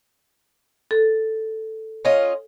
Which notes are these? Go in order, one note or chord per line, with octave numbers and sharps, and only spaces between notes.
A4
C#4 F4 D#5